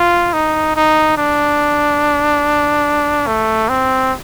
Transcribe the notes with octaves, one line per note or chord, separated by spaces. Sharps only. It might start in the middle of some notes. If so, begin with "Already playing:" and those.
Already playing: F4
D#4
D#4
D4
A3
C4